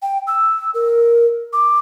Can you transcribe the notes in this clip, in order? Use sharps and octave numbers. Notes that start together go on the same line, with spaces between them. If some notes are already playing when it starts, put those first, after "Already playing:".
G5
E6
A#4
D6